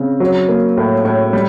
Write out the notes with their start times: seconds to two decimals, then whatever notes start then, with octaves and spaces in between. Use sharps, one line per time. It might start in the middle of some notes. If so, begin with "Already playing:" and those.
Already playing: C#3 C4
0.20 F#3
0.49 A#3
0.77 A2
1.05 A2
1.33 G3